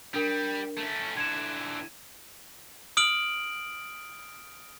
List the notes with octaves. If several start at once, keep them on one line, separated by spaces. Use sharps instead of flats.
G3 D4 A#4
A3 C#4
D3 E3 G#6 E7
D#6 F6 D7 F#7